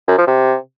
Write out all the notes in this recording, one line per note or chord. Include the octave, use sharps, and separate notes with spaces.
F#2
F3
C3